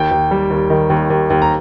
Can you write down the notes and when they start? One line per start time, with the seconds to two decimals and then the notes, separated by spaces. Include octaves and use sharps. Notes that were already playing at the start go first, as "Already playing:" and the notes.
Already playing: D#2 G5
0.11 D#2
0.31 G3
0.50 D#2
0.70 D#3
0.90 D#2
1.10 D#2
1.30 D#2
1.42 A#5